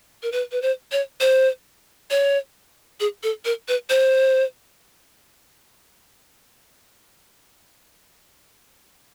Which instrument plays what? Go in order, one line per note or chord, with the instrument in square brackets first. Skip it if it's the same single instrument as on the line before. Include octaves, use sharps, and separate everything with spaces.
[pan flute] A#4
B4
B4
C5
C#5
C5
C#5
G#4
A4
A#4
B4
C5